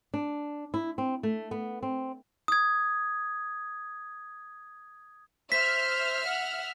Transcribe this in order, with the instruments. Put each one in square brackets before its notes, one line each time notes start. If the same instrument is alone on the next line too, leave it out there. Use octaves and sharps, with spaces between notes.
[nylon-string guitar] D4
E4
C4
A3
B3
C4
[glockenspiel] D#6 G#6
[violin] C5 [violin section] E5 F6 [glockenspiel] B6
[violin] F#5